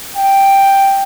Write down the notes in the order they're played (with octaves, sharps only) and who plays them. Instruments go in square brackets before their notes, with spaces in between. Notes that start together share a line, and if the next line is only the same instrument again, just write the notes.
[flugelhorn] G5